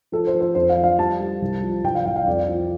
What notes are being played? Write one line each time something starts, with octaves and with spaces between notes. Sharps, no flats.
F3 A4
C5
F3
C5
F2 C5
F5
F3
F5
G3 A5
G3
C2
F3
C2 G5
F5
C2 F5
F5
F2 D5
F3